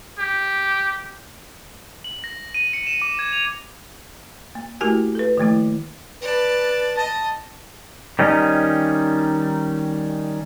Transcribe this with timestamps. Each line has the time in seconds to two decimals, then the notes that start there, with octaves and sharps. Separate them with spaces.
0.19 G4
2.04 F#7
2.24 A#6
2.54 D#7
2.73 C#7
2.87 E7
3.02 D6
3.19 G#6
3.33 F7
4.55 A#3
4.81 A3 E4 F#4 G4 A#4 G#5
5.15 A4 B4
5.37 D#3 F3 A3 A#3 E4
6.22 B4 D5 A5
6.97 D#5 A5
8.19 D#3 G3 C#4 D#4